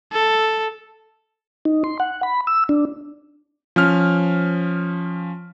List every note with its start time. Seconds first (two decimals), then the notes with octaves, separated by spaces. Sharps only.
0.12 A4
1.65 D#4
1.84 C6
2.00 F#5
2.23 B5
2.47 E6
2.69 D4
3.76 F3 C#4 F6